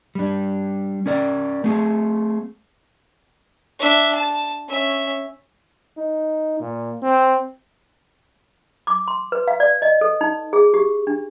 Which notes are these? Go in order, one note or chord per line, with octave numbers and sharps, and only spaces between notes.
G3 D4
C#4 A#4 D5
A3 C4 G#4
D4 E5
A5
C#4 E5
D#4
A#2
C4
D6
C6
B4
F5
D5
D#5
A4
D#4
G#4
G4
D4